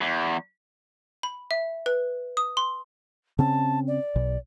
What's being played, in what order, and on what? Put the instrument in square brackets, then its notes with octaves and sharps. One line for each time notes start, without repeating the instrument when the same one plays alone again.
[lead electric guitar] E2
[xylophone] B5
E5
B4
D#6
C6
[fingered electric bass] C#3 C4 C#4 [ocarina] A5
[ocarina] D5
[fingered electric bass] B1 B2